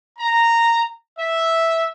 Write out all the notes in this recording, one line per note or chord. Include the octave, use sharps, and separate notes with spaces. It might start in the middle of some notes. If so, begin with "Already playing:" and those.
A#5
E5